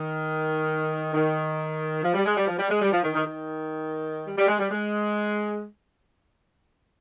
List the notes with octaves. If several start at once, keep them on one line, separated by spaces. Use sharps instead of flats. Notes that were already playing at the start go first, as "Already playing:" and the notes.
Already playing: D#3
D#3
F3
G3
G#3
G3
F3
G3
G#3
G3
F3
D#3
D#3
D#3
G3
G3
G#3
G3
G#3